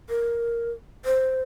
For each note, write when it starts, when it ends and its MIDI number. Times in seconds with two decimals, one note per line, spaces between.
0.10 0.72 70
1.05 1.42 72